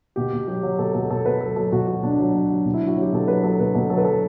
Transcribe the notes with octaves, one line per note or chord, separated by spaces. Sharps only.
B2 G4
B2
F#3 G4
F#3
B2 A4
B2 A4
B2 A4
B2 B4
F#3 A4
F#3 A4
B2 F#4
F#3 F#4
B2 D4
F#3
F#3
F#3
B2
E4
F#3 F#4
F#3 G4
B2 A4
F#3 B4
F#3 A4
B2 B4
B2 A4
F#3 A4
B4
F#3 A4